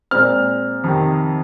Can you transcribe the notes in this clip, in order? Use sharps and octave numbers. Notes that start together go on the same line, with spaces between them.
A#2 G#3 C4 F6
F2 C3 D#3